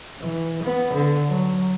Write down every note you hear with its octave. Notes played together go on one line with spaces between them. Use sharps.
E3
B3
D3
F#3